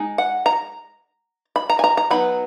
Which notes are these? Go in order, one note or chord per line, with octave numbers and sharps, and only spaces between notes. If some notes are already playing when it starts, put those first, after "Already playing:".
Already playing: G#3 D#4
F#5
A#5
B5
A#5
G#5
A#5
A#5
F#3 B3 D#4 B5